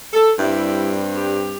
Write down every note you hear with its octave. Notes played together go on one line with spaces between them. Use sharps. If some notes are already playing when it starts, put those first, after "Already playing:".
A4
G2 G3 C4 E4
G4